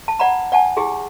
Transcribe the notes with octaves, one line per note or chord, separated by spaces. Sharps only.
A5
D5 F#5 A#5 B5
D5 F#5 G#5 A5
E4 G4 G#4